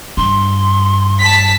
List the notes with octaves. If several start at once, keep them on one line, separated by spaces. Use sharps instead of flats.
G2 C6
A5 B6